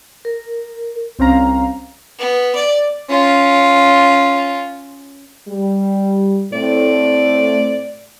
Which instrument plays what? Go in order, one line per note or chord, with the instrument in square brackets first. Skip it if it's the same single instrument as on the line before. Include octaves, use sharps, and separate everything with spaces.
[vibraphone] A#4
[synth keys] C2 C4 C#4 F5 A#5
[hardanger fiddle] B3
D5
C#4 F4
[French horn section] G3
[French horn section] A2 A3 C4 [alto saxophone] D5